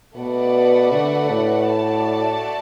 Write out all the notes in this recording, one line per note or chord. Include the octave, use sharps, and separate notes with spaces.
B2 A3 F#4 B4 D5 F#5
D3
A2
A3 F#4 D5 A5